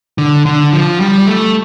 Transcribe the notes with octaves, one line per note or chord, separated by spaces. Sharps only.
D3
D3
F3
G3
A3